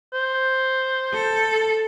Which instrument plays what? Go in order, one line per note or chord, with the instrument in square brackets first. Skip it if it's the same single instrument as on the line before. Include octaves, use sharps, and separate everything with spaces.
[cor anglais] C5
[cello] A4